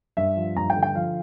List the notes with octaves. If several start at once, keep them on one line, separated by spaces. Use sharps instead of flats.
G2 E5
F3
G2 A#5
G5
D3
G5
F3 F5